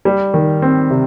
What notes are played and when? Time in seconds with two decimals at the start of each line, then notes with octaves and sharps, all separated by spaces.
0.05 G3
0.34 D#3
0.62 C4
0.90 C3